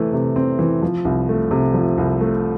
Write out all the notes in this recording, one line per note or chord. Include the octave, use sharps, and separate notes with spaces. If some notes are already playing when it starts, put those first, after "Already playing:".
Already playing: C3 E3 A3
C3
C4
E3
F3
C2
A3
C3
F3
C2
A3